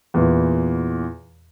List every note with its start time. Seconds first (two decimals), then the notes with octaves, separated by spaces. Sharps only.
0.14 E2 A#2 E3